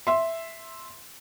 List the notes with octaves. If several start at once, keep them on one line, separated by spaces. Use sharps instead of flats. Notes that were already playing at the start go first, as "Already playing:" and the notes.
E5 C6